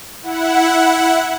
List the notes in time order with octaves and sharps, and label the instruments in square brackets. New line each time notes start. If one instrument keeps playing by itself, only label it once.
[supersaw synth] E4 F#5